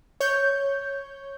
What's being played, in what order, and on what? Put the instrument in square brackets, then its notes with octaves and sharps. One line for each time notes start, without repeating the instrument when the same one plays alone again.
[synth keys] C#5 G6